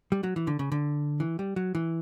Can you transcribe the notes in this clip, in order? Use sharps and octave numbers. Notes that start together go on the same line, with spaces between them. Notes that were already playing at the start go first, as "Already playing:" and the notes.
G3
F#3
E3
D3
C#3
D3
E3
G3
F#3
E3